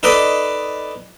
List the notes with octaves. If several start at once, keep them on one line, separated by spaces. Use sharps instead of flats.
D#4 A4 B4 D5 D#5